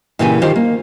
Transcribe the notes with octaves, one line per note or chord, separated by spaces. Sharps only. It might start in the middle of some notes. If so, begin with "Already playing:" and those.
A#2 C#3 E3 G4 G5 G#5
D#3 F4 G4 C5
A#3